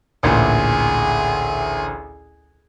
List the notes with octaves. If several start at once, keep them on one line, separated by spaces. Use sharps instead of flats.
A1 D2 A#2 G#4